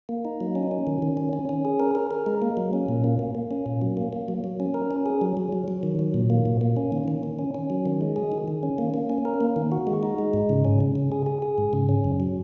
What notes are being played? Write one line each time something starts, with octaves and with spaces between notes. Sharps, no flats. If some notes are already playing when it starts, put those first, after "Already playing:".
A#3
D#4
F#3
C#4
C#4
D#3
D#3
C#4
C#4
C#4
G#4
A#4
A#4
A#4
G#3
A#3
F#3
C#4
A#2
A#3
A#3
A#3
C#4
A#2
F#3
A#3
A#3
F#3
F#3
C#4
A#4
C#4
G#4
F#3
F#3
F#3
F#3
D#3
F#3
A#2
A#3
A#2
A#3
C#4
D#3
D#3
D#3
C#4
C#4
F#3
D#3
G#3
G#4
D#3
D#3
C#4
A#3
A#3
C#4
A#4
A#3
D#3
F#4
G#3
D#4
G#3
G#2
C#3
C#4
C#3
C#3
G#4
G#4
G#4
G#2
C#3
C#4
F#2
F#3